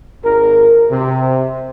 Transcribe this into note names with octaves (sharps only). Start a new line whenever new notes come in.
G#1 A#4
C3